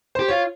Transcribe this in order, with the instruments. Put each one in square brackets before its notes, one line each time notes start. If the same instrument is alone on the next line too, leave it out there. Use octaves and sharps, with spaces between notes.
[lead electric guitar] G4 [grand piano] C5
[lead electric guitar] F4 [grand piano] C#5